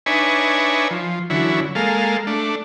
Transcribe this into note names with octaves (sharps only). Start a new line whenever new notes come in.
D4 D#4 B4 C#5 E5 G#5
F3
D3 E3 F#3 C#4 E4
G#3 A#3 A4 F5
A3 D4